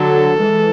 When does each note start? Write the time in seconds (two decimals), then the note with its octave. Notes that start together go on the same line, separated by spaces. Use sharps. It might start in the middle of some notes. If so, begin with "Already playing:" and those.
Already playing: D3 F#3 A4
0.38 E3 G#3